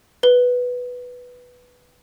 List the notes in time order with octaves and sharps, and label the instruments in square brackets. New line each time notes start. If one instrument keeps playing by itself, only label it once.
[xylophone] B4 G7